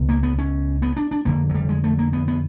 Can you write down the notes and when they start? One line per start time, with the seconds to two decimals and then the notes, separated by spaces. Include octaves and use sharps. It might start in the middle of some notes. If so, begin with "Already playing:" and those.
Already playing: C#2 B2
0.09 A#3
0.23 B3
0.38 C#4
0.82 B3
0.97 D4
1.11 D4
1.25 F2 D3 A#3
1.49 F#3
1.55 G3
1.69 G#3
1.84 A3
1.98 A#3
2.13 B3
2.28 B3